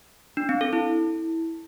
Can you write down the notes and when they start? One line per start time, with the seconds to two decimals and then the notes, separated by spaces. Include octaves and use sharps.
0.37 D4
0.49 C4
0.61 A4
0.73 E4